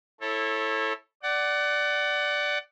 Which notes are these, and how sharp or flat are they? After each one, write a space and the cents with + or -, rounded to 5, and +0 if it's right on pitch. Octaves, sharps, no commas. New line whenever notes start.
E4 -10 A4 +0 C#5 -30
D5 +0 F#5 +25